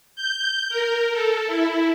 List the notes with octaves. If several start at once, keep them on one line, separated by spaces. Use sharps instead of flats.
G6
A#4
A4
E4